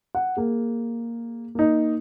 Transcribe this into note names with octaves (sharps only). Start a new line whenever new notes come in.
F#5
A#3 G#4
A#3 D#4